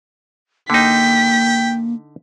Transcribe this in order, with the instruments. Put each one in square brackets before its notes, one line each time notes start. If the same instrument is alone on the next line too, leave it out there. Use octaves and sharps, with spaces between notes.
[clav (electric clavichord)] D3 D#4 [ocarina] A#3 [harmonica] G5 [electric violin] B6